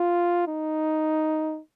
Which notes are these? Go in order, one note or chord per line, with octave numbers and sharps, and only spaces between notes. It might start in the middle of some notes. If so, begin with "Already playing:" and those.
Already playing: F4
D#4